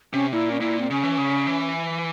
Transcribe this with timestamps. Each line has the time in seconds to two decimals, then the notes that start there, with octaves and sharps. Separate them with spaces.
0.13 C3 C#4
0.32 A#2 E4
0.52 C#4
0.60 A#2 E4
0.80 C4
0.90 C#3 C#4
1.04 E3
1.18 C#3
1.47 E3